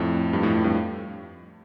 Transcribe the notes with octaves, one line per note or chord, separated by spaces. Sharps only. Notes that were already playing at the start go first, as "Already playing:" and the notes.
Already playing: F2 A2
G2
F2 A2
F2 A2
G2